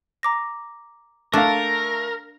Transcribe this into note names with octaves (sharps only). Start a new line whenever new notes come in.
A#5 D6 A#6
A3 D4 A#4 F5